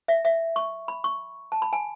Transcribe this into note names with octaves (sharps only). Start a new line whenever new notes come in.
E5
E5
C#6
B5
C#6
A5
B5
G#5